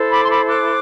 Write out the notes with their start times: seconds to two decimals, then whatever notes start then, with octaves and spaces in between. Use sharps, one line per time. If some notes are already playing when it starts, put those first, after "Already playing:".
Already playing: E4 A4 C5
0.10 B5 D6
0.23 C6
0.29 B5 D6
0.47 D6 F#6